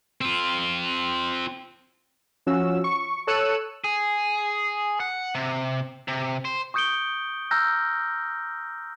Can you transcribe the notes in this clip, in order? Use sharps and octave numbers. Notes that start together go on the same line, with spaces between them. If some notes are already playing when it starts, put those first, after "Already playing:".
C4 F4
F3 C#4 F#4 E6
C#6
A4 C#5 E6 F#6 C#7 D#7
G#4
F#5
C3
C3
C5
C#6 D#6 G6 C#7 D7 G7
A#5 E6 F6 G6 A#6